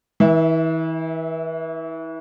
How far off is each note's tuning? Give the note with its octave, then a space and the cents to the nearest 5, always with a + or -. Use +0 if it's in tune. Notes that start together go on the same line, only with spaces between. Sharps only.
E3 -35 E5 +0